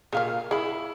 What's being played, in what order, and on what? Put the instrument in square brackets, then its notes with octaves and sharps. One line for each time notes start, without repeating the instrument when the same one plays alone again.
[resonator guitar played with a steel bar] A#2 F5 [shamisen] G#4 A#4
[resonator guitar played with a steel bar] E4 [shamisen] G#4 B5